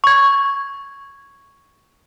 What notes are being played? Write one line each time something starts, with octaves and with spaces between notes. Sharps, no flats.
C#6 G#6